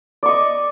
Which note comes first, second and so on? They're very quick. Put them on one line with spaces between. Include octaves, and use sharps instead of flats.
D5 C#6 D#5